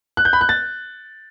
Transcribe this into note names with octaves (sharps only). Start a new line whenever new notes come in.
F#6
G6
B5
F#6
A6